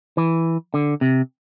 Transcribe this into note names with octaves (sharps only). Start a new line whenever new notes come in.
E3
D3
C3